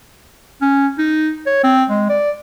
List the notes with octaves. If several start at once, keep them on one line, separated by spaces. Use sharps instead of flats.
C#4
D#4
C#5
C4
G#3
D5